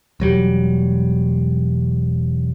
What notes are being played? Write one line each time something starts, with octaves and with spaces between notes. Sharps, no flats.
E1 F#3 G3